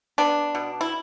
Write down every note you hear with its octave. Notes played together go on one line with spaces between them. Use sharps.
B3 D4
B2
E4